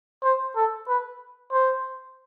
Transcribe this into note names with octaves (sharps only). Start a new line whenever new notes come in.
C5
A4
B4
C5